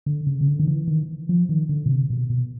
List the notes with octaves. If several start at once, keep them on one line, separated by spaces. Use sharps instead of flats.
D3
C#3
C#3
D3
D#3
E3
D#3
F3
D#3
D3
B2
C3
B2
B2